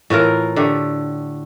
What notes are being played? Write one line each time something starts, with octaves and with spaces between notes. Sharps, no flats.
A2 E3 F4 A#4
D3 A3 G4